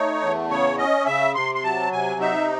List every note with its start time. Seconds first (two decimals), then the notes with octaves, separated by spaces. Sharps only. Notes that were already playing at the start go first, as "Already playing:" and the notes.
Already playing: A3 D#4 C#5
0.21 E2
0.49 C#3 C#5
0.78 C#4 D#5
1.06 C#3 E5
1.35 C3 C6
1.55 C6
1.64 F#3 A5
1.92 C3 G#5
2.20 D#4 E5